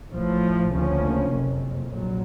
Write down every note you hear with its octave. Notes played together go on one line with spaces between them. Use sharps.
A1 A2 F3
D2 C#3 F3 A#3 C#4
F#1 F2 C3
A#1 A#2 F#3